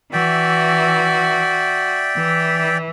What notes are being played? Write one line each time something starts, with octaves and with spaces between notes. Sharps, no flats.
E3 F#4 D5 E5 G5
E3